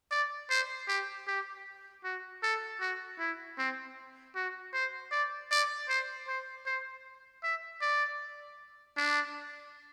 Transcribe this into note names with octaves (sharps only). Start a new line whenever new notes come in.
D5
C5
G4
G4
F#4
A4
F#4
E4
C4
F#4
C5
D5
D5
C5
C5
C5
E5
D5
D4